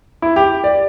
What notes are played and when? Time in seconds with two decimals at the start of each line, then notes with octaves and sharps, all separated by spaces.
0.22 E4
0.36 G4
0.64 D5